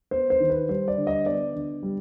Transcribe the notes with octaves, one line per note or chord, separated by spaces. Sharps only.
B3 C5
C5
D#3
B4
G3 C5
D5
D3
D#5
B3 D5
D3
G3